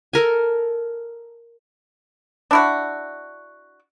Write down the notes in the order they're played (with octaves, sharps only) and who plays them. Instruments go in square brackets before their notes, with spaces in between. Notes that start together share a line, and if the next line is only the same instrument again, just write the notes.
[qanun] A4 A#4 G#5
[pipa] D4 E4 F#4